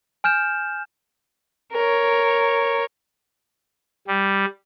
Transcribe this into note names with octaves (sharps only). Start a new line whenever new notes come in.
G#5 F6 G6 E7
A#4 C#5
G3